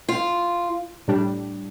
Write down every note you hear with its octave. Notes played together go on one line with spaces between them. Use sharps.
F4
A2 G3 D4